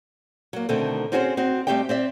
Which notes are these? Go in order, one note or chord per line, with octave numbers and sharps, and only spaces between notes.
F#3 A#3
B2 D3 D#3 A3 C4
C4 C#4 F#4 G#4 A#4 C5
C4 D#4 F#4
G3 A3 C4 G4 D#5 G5
C4 D5 E5